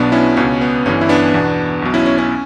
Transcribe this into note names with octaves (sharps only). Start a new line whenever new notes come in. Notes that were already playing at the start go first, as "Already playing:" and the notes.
Already playing: B1 B2 B3 D4
C#4 E4
C#2 B2 C#4
B3
G1 G2 E3 C#4
E4
B3 D4
E2 B2
B1 B2
C#4 E4
C#4
C#4